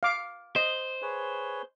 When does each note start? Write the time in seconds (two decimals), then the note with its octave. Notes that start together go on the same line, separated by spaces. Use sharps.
0.03 F5 D6
0.56 C5 D#5
1.02 G#4 B4 C#5